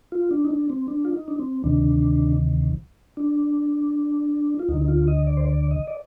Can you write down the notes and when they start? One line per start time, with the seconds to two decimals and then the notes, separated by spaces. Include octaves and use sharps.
0.12 F4
0.31 D4
0.45 D#4
0.51 D4
0.70 C4
0.88 D4
1.05 F4
1.13 D#4
1.28 D4
1.40 C4
1.64 D2 C3 D#3 D4
3.17 D4
4.59 F4
4.69 D2 D#4
4.74 D3
4.82 D#4
4.88 F4
5.08 D#5
5.27 D5
5.37 C5
5.45 D5
5.71 D#5
5.87 D5